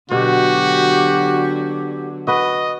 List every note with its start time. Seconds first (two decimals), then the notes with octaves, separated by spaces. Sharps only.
0.11 B2 D3 F#3 F#4 G4
2.27 F#4 B4 D#5